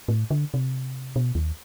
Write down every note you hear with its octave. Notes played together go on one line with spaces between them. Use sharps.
A2
D3
C3
B2
D#2